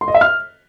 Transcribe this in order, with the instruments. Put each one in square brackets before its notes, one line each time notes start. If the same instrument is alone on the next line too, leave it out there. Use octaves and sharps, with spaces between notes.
[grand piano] C6
D#5
E5
F6